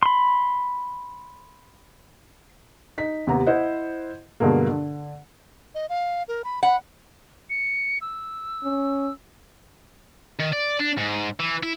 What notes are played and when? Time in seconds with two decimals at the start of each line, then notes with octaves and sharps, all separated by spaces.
0.03 B5 C6
2.98 D#4 B6
3.27 D#2 C3 B3 A#5
3.46 E4 C5 D#5 F#5
4.40 G2 B2 D3 G#3 A#3
4.69 D3
5.75 D#5
5.89 F5
6.28 A#4
6.44 B5
6.63 F#5 B5
7.50 C#7
8.01 E6
8.64 C#4
10.39 D#3
10.52 D5
10.79 D4
10.97 G#2
11.40 E3
11.63 E4